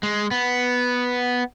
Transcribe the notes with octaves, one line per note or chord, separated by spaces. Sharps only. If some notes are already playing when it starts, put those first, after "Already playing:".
G#3
B3